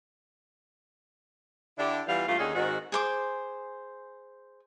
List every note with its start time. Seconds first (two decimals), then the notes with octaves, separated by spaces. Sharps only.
1.78 D3 D4 E4 G4
2.07 E3 G3 B3 F4 F5
2.27 G2 A3 A#3 F4
2.39 D#2 D3 C#4 D#4 G#4
2.54 G#2 D#3 C4 F#4
2.92 G#4 C5 D6